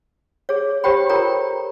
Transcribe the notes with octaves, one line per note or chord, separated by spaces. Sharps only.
G#4 C#5
G4 C5 C#5 G5 B5
F4 A4 A#4 C#5 G5 A#5